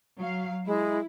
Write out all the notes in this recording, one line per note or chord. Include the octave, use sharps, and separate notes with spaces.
F#3 F5
G#3 E4